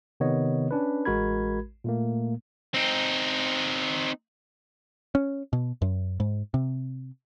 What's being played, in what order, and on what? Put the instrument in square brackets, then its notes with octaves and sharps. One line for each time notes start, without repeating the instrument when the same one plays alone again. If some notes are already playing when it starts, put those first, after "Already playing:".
[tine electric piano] C3 D#3 B3 C#5 D#5
C#4 D4 B4
A1 G#3 F#4 A#4 B5 G#6
A#2 A3 A#3
[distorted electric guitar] C4 D#4
[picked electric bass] C#4
B2
F#2
G#2
C3